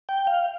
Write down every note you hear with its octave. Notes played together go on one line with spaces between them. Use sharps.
G5
F5